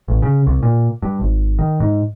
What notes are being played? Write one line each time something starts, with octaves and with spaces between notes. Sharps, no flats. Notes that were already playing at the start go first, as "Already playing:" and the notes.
A1
C#3
C2
A#2
G2
G#1
D#3
G#2